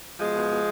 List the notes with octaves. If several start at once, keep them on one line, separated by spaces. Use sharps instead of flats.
B2 F3 G#3
B2
B2